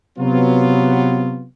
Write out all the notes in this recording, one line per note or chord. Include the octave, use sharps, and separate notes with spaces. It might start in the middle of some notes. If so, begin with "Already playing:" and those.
C3 F#3 B3 F4